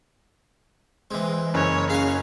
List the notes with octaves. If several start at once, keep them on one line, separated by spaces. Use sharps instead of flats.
E3 G#3 C4
F#1 C#4 C#5
F#4 G#4 F5